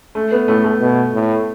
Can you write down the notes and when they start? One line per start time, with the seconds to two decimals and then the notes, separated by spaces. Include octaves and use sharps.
0.15 A3
0.32 B3
0.48 A2 A3
0.64 A3
0.81 B2
1.14 A2